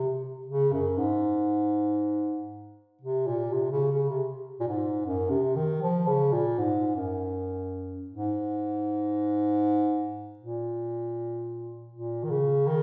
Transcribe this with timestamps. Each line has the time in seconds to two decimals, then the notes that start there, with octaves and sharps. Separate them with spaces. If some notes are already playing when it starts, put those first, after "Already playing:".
Already playing: C3
0.47 C#3
0.72 F#2
0.98 G#2
3.01 C3
3.27 A#2
3.53 C3
3.71 C#3
3.91 C#3
4.09 C3
4.60 A#2
4.67 G#2
5.05 F#2
5.30 C3
5.56 D#3
5.82 F3
6.07 C#3
6.32 A#2
6.58 G#2
6.96 F#2
8.10 G#2
10.39 A#2
11.92 A#2
12.24 D#3
12.30 C#3
12.67 D#3